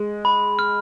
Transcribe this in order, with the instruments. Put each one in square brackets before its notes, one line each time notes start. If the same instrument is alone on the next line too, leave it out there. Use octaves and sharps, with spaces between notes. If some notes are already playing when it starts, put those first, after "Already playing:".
Already playing: [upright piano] G#3
[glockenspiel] B5
F6